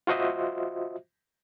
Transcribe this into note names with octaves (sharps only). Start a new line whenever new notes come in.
F4 F#4 C5 D#5 E5